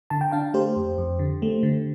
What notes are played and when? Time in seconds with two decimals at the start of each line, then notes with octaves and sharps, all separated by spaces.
0.10 D3 A5
0.21 G5
0.31 D4 F5 A5
0.54 A3 G4 C5
0.76 F2
0.98 F2
1.19 D3
1.42 A3
1.63 D3